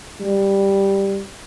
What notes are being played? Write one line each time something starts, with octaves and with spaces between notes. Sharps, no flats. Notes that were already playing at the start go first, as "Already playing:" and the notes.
G3